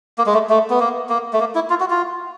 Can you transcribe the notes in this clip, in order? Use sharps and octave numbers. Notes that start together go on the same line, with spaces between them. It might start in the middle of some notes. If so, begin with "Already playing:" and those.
A#3
G#3
A3
A3
B3
A#3
A#3
A3
A#3
E4
F4
F#4
F4